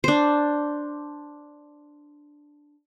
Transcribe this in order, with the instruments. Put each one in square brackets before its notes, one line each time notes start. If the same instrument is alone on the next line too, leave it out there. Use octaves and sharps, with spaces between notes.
[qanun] D4 C5